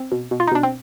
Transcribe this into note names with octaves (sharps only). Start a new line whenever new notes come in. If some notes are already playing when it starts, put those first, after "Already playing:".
Already playing: C4
B2
B2
F4
D#4
B2 D4
C4